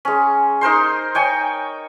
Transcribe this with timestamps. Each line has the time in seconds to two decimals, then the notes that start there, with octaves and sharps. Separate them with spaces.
0.05 G#3 C#4
0.61 D#4 A#4 C5 C6
1.15 C#5 G5 G#5 C#6